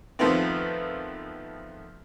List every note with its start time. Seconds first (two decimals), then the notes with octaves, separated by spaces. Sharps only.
0.19 F2 D#3 F3 A3 B3 C4